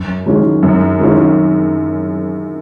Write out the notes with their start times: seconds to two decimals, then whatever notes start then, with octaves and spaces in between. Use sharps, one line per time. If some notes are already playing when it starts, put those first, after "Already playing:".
Already playing: F#2
0.26 D#3 G#3 C#4 F4
0.63 F#2
1.00 D#3 G#3 C#4 F4